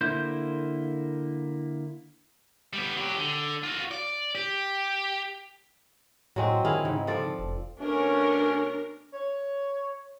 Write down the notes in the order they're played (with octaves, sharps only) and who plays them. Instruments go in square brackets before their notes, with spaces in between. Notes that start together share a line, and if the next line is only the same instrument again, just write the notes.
[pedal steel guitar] D3 A#3 E4 C5 G6
[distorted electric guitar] G3 B3
F#3 G4
D3
F4 F#4
D5
G4
[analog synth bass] A2 [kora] F#3 G#3 C4
[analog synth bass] D#3 [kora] E4 G#4 F5
[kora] G#2 [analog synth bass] C#3
[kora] F3 A4 D5
[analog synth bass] F1
[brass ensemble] B2 A3 C#4 [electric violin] D4 A#4
[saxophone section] C#5